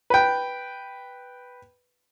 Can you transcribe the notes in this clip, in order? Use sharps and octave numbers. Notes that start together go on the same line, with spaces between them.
B4 G5